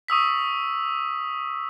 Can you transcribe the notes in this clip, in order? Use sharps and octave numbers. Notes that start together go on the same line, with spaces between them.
C#6 D#6 E6 B6